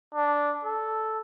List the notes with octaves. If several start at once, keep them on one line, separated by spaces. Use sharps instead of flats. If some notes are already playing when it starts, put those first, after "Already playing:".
D4
A4